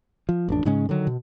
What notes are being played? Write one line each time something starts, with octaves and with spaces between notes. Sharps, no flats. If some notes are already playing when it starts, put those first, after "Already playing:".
F3
A1 F2 D4
G#2 C#3 G#3 C#4
D3 D#3 F#3
B2